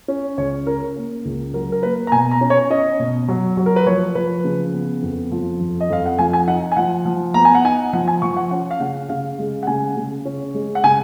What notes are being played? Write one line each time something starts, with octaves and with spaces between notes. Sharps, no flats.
C#4
C#2 C#5
C#4 A#4
A#3
C#2
F#3 A#4
A#4
A#3 B4
A#5
B2 G#5
A#5
C#4
C#5
C#4 D#5
B2
F#3
F#3
A#4
B4
F3 C#5
F3 B4
C#3
B3
F2
F3
F2
D#5
F2 F5
F#5
F3 G#5
G#5
D#4 F#5
G#5
F3 F#5
F3
B3 A#5
G#5
F#5
D#4 G#5
F3 F#5
G#5
F3 C#6
F#5
C#4 F#5
F5
C#3 F#5
C#3 F5
G#3
F#5
C#3 G#5
C#3
C#4
G#3
F#5
C#3 G#5